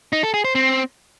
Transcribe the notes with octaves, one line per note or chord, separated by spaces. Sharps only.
D#4
A4
G#4
C5
C4